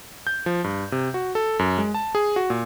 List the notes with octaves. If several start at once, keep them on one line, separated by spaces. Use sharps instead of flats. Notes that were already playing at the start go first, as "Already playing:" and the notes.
G6
F3
G2
C3
F#4
A4
F#2
G#3
A5
G#4
F#4
A#2